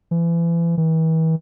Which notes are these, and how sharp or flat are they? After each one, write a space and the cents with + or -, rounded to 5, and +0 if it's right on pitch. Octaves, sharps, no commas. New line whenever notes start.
E3 +35
E3 -40